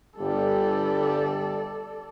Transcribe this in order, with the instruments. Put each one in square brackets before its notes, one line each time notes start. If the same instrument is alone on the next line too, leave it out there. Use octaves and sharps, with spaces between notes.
[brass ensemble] G1 G3 [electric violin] A4 D5